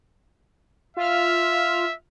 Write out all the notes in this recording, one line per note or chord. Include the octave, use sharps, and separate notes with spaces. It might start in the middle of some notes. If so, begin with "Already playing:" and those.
F4 E5 F6